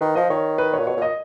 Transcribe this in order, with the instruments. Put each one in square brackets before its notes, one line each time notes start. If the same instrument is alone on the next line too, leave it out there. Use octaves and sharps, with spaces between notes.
[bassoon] D#3 [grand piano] B4
[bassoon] F3 [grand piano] D#5
[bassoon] D#3 [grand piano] C#5
[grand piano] B4
C#5
[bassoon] A#2
[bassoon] B2 [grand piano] C#5
[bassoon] A#2
[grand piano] D#5